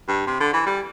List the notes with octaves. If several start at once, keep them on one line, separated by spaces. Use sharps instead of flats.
G2
C3
D3
E3
G3